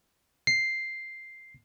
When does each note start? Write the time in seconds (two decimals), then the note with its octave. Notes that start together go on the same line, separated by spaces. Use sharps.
0.47 C7